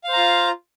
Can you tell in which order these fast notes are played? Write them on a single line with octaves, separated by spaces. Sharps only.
F5 C5 A#5 F4